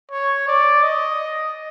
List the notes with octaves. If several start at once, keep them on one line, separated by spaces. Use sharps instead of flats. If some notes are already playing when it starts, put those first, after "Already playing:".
C#5
D5
D#5